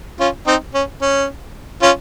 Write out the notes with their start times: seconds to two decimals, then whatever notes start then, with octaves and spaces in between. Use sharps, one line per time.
0.20 C#4 F4
0.47 C4 D#4
0.74 C#4
1.01 C#4
1.82 C#4 F4